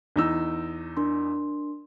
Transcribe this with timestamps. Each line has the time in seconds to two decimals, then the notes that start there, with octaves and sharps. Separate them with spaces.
0.16 E2 D#4 E6
0.97 D4 A#4 C6